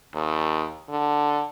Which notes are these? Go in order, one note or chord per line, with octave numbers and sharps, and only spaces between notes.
D#2
D3